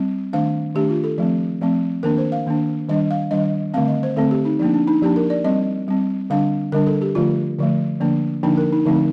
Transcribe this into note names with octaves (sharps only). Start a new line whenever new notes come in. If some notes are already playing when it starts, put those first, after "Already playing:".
Already playing: G3 C4
D#3 A3 D4 F5
D#3 A3 D4 G4
F4
A4
F3 A3 C4
F3 A3 C4
D#3 A#3 D4 A#4
C5
F5
D#3 A#3 D4
D#3 G3 D4 D#5
F5
D#3 G3 D4 D#5
D3 A3 C4 F5
D#5
C5
D3 A3 C4 A4
G4
D#4
F3 A#3 D4 D#4
D4
D#4
F3 A#3 D4 G4
A#4
D5
G3 C4 D#5
G3 C4
D3 G3 D4 F5
D3 G3 D4 A#4
A4
G4
D3 F3 A3 F4
D3 F3 A3
D3 F3 A#3 D4
D3 F3 A#3 D4 D#4
A#4
D#4
D3 F3 A3 C4 D#4